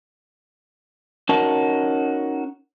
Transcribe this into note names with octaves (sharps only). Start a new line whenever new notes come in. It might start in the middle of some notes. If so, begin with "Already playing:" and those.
C#4 D#4 F#4 A#4 A5